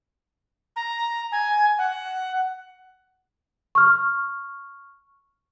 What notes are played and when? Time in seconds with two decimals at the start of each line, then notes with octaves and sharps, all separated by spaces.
0.76 A#5
1.32 G#5
1.78 F#5
3.75 C#6 F6